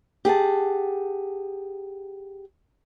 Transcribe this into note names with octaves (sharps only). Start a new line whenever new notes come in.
G4 G#4 F#5 A5